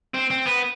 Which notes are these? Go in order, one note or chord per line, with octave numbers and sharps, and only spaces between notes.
C4
C4
B3